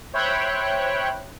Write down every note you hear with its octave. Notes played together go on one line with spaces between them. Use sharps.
C5 C#5 E5 G5 B5 F#6